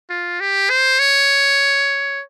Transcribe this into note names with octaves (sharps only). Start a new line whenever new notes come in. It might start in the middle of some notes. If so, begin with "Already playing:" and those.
F4
G4
C5
C#5